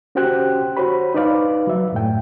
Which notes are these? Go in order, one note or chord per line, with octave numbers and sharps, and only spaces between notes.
C#4 F#4 G4 C5 G5 F#6
F#4 C5 C#5 B5
D#4 B4 D5 F5
F#3 E5
F#2 A2 G5